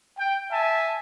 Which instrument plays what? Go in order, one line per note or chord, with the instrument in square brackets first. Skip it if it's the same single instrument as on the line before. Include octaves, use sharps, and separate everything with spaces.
[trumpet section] G5
E5 G#5 A5